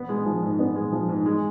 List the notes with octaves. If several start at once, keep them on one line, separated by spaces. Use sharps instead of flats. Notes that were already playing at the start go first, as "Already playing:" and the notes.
Already playing: B3
G#3
F3
G#2
B3
G#3
F3
G#2
G#3